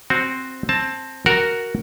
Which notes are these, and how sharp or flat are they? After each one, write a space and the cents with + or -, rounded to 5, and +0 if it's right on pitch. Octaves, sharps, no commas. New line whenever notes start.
C4 +0 F#4 +0
C4 +10 A5 +0
F#4 +5 A#4 +0 F#5 +0